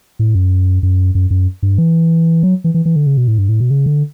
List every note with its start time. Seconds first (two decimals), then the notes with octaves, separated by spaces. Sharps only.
0.19 A2
0.35 F#2
0.83 F#2
1.15 F#2
1.31 F#2
1.63 G2
1.78 E3
2.43 F#3
2.64 E3
2.74 E3
2.85 E3
2.96 D3
3.07 C#3
3.17 B2
3.28 A2
3.38 G2
3.49 A2
3.60 B2
3.71 C#3
3.86 D3